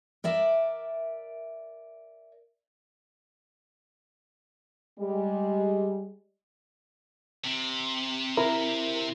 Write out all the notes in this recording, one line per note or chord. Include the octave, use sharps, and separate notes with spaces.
A#4 D5 E5
G3 G#3
C3
E4 A#4